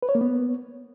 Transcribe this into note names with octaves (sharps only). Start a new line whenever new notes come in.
B4
C#5
A#3
B3